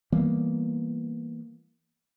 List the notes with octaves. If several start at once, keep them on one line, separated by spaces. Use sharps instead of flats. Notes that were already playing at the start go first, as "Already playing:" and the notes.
E3 G3 A#3 B3